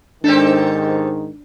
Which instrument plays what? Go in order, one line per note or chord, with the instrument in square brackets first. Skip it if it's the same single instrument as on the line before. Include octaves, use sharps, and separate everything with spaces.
[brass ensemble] G#2 D#3 [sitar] C4 G4 A4 [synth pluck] D4